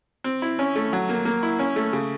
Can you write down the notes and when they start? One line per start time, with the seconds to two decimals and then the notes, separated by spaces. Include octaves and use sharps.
0.24 C4
0.42 E4
0.59 C#4
0.75 A3
0.93 F#3
1.09 A#3
1.25 A#3
1.43 E4
1.59 C#4
1.76 A3
1.93 C#3